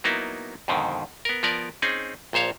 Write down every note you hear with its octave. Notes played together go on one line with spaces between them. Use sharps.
F#3 A#3 B3 D#4 E4
F2 G#2 B2 D3 D#3
B3 A#4
F3 B3 A#4 D5
C4 C#4 D#4 G#4
A#1 A#2 C5 C#5 F5